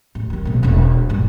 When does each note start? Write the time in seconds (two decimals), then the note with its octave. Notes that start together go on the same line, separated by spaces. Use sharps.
0.15 A1
0.30 D#3 G3
0.45 A#1 B2
0.63 E1 D4
1.09 A#1 G2